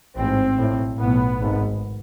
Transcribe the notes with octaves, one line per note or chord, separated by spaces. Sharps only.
A1 G#2 C4
B1 A2
B1 A2 B3
G#1 G#2